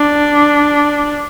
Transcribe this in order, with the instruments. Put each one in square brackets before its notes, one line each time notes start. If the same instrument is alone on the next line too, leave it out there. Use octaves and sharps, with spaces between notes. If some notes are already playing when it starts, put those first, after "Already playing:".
Already playing: [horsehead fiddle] D4